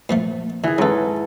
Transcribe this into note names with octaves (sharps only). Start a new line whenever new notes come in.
A#2 F3 A3
D3 E3 G#4
G#2 E3 C#4 A4